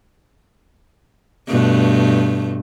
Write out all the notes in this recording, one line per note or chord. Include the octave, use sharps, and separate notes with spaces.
G2 B2 A3